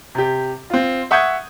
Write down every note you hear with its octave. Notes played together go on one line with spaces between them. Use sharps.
C3 G4
C4 F4
E5 F#5 C#6 D#6 G6 G#6